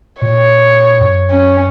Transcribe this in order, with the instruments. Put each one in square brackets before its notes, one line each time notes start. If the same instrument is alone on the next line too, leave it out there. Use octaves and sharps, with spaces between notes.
[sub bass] A#2 [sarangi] C#5
[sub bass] F#2
[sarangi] C#4